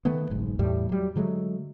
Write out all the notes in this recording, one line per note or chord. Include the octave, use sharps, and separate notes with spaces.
D#3 A3 B3
F#1 B1 G#2
E2 A2 G3
F#3 G3
D3 F#3 G#3 A3